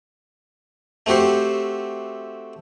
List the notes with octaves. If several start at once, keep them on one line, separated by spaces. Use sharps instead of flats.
A3 C4 F#4 G4 C5